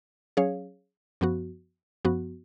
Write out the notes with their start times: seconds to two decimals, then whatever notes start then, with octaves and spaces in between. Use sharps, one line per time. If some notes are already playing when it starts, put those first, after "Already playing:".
0.37 F#3 C#4 G#4 C#5 F5
1.21 F#2 F3 B3 F#4
2.05 F#2 F3 B3 F#4